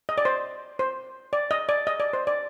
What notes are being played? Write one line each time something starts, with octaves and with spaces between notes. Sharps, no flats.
D#5
D5
C5
C5
D5
D#5
D5
D#5
D5
C5
D5